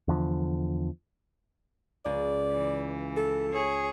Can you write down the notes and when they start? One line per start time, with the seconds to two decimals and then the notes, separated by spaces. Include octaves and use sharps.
0.08 E2 D3 F3
2.06 C#2 D5
2.53 E3
3.17 A4
3.52 G#4 C#5